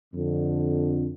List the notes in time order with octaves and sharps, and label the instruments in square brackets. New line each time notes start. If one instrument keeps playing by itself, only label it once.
[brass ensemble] F2 D3